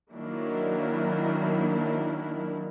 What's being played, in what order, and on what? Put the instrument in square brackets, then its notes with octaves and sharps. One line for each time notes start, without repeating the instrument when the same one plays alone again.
[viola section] D#3 F#3 A#3 D4 E4